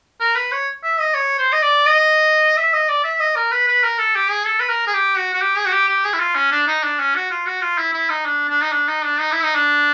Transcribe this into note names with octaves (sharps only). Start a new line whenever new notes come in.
A#4
B4
C#5
E5
D#5
C#5
C5
D#5
D5
D#5
E5
D#5
D5
E5
D#5
A#4
B4
B4
A#4
A4
G4
G#4
A4
B4
A#4
G#4
G4
F#4
F#4
G4
G#4
F#4
G4
G4
G#4
E4
F4
C#4
D4
D#4
D4
C#4
F#4
F4
F#4
F4
E4
E4
D#4
D4
D4
D#4
D4
D#4
D4
D#4
E4
D#4
D4